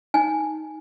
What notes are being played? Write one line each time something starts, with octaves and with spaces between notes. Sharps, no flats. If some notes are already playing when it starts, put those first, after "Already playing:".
D#4 G#5